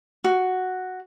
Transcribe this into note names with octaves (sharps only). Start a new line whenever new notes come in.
F#4